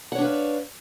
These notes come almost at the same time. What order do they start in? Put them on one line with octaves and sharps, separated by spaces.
F#5 C#5 D4 B4 F5